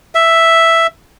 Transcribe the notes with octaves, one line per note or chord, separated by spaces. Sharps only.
E5